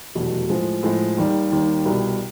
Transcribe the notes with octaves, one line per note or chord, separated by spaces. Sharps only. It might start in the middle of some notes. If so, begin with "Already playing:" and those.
F1 E2 B2 F#3 A3
A2 F3 G#3
A2 F3 G#3
D#2 D#3 G3
D#2 D#3 G3
C2 B2 G3